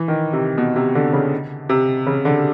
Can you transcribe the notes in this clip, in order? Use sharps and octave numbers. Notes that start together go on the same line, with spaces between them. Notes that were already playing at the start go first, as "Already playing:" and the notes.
Already playing: E3
D#3
C3
B2
C3
D3
C#3
C3
C#3
D3